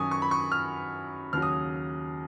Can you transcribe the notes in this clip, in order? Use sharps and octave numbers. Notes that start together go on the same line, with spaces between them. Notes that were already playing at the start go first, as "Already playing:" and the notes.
Already playing: F#2 D#3 F#3 G#5 C#6 D#6
C#6
B5
C#6
F6
D#2 C#3 F#3 F6
D#6